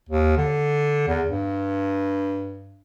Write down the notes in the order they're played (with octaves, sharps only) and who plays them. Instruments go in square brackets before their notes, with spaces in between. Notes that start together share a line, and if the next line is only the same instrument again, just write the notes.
[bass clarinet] D#2
D3
E2
G2